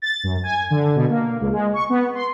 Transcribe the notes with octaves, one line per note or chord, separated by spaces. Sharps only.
A6
F#2
G#5
D3
B2
A#3
C#2
G#3
C#6
B3
C6